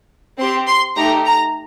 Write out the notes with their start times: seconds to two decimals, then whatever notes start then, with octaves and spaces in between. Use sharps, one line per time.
0.39 C4 G4 C6
0.68 C6
0.96 A3 D#4 G4 A#5
1.25 A#5